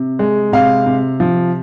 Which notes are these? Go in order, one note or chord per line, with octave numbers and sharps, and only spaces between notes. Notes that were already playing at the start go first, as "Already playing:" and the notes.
Already playing: C3
G#3
C3 F5
C3
F3